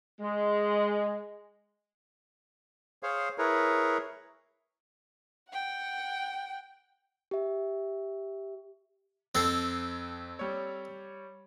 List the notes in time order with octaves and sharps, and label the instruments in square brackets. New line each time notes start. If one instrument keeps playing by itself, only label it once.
[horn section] G#3
[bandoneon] G#4 C5 C#5 F5
E4 G#4 A#4 B4 C#5
[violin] F#5 G5
[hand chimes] G4 E5
[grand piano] F2 C7 [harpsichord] C4 A4
[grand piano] G3 C#5